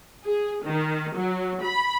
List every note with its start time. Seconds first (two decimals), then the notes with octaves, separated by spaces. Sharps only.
0.24 G#4
0.64 D#3
1.16 F#3
1.63 B5